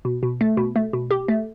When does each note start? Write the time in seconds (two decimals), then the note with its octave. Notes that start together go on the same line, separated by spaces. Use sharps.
0.05 B2
0.23 B2
0.41 A3
0.57 B2
0.76 A3
0.93 B2
1.11 G4
1.28 A3